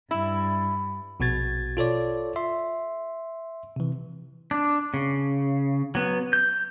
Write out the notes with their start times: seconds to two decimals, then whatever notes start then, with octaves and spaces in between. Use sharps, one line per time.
0.11 G2 E4
1.20 A#1 B2 F#4 G#6 A6
1.77 F4 A4 C#5 D5
2.36 E5 C6
3.76 C3 E3
4.51 D4
4.94 C#3
5.95 F#3 B3
6.33 G6